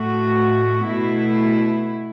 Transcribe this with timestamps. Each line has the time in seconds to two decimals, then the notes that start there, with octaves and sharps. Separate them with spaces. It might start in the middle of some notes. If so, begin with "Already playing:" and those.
Already playing: A2 A3 F#4
0.87 B2 A3 E4